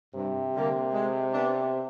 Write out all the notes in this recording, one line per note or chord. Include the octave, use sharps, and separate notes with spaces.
G2 C3
D3 G3 A#3
G#3
B3 D4